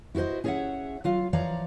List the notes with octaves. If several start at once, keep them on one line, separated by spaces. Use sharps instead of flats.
E4 F#4 A4 C5 D#5
C#4 G#4 C#5 D5 E5 F#5
F#3 F4 F5
E3 F3 C#5 D5 F5 A#5